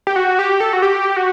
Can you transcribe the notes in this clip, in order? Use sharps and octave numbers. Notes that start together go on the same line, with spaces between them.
G4
F#4
G4
A4
F#4
G4
F#4